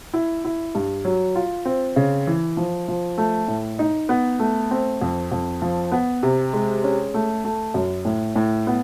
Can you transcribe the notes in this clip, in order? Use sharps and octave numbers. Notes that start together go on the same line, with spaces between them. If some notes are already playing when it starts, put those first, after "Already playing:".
E4
E4
G2
F#3
F4
C4
C#3
E3
F3
F3
A3
A2
D#4
B3
A3
C4
F2
F2
F3
B3
C3
G#3
C#4
A3
A3
F#2
A2
A2
B3